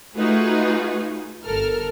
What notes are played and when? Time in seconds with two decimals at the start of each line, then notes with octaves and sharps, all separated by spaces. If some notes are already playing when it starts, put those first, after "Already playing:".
0.17 A3 D#4 F4 F#4 G#4 B4
1.45 G1 A4 A#4 F6